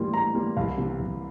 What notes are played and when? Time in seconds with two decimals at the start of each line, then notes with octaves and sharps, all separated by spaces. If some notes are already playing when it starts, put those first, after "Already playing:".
Already playing: A2 E3 G3 A#3 C6
0.13 A2 A#5
0.35 E3 G3 A#3
0.57 C2 F5
0.78 C3 E3 A#3
0.99 C2